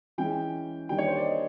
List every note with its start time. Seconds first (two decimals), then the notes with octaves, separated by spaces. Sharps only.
0.18 E3 G#3 C#4 G5
0.89 D#3 G3 A#3 D4 G5
0.98 C#5
1.07 C5
1.16 D5
1.25 D#5